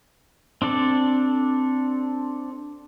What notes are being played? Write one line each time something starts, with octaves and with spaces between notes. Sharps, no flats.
C4 D4 A4 D5